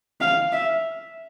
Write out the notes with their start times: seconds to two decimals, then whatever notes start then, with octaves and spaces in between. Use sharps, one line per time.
0.21 F5
0.52 E5